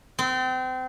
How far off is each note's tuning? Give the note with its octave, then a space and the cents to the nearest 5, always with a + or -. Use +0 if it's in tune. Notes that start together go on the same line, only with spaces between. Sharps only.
C4 -30